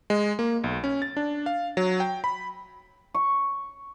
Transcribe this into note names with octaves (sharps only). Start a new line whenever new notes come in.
G#3
A#3
B1
C#4
A6
D4
F5
F#3
G5
B5
C#6